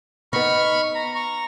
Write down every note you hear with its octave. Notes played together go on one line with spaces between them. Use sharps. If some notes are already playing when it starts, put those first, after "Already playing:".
B3 D#4 B5 C#6 F6
A#5
A#5 C#6